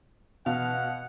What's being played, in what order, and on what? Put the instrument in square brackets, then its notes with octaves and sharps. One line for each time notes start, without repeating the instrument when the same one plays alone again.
[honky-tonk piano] B2 [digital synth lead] F5 [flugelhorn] F#5